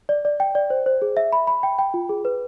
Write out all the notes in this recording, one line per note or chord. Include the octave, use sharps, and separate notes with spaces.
D5
D5
G5
D5
C5
C5
G#4
E5
B5
B5
G5
G5
F4
G#4
B4